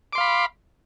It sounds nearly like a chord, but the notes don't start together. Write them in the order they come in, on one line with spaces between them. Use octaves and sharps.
D6 C6 F5 B5